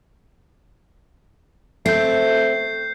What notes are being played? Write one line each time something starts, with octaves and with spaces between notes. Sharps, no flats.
A3 C4 G6 C7